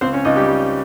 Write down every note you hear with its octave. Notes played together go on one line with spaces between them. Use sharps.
C#2 C4 C5
C#4 C#5
C#2 D#4 D#5
G3 G4
G3